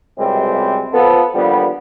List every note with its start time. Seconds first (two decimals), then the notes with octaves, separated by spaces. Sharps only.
0.17 C#2 F#2 C3 G3 G#3 C4
0.94 F3 B3 A4
1.35 D#2 D3 F3 G3 B3